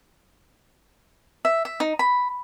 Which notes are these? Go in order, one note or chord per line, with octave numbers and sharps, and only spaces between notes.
E5
E5
D#4
B5